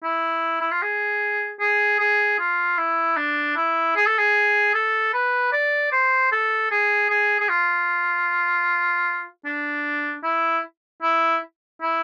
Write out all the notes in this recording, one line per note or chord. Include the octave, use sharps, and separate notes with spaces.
E4
E4
F4
G#4
G#4
G#4
F4
E4
D4
E4
G#4
A4
G#4
A4
B4
D5
C5
A4
G#4
G#4
G#4
F4
D4
E4
E4
E4